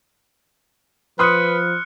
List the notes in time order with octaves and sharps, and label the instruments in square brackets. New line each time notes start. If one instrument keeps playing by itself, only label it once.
[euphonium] F3 [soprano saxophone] B4 [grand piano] B5 C6 D#6 [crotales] F6 F#6 C#7